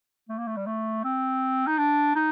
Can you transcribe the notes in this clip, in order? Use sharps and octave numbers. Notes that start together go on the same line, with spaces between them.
A3
A#3
A3
G3
A3
C4
D#4
D4
D#4